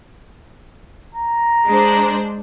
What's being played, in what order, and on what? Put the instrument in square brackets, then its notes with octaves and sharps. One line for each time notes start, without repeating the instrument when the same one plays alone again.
[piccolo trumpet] A#5
[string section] G#3 D4 C5